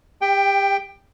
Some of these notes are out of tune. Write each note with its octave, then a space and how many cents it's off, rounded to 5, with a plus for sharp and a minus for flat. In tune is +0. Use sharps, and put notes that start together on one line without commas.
G4 +30 G5 +5